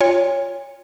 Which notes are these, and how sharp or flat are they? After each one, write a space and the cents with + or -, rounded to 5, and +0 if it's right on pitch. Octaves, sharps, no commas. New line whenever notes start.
F4 +0 C#5 +0 G#5 -40